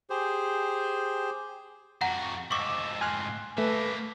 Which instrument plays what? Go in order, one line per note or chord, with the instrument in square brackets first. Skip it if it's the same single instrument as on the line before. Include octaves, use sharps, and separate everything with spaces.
[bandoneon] G4 G#4 C5
[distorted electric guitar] F2 F#4 [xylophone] F#5 A#5
[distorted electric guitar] F2 G#2 [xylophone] C#6 D6 [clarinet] E6
[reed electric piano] G#5 F6 F#6 [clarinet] C6
[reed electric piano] A3 [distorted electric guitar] A#3 E5 [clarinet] B4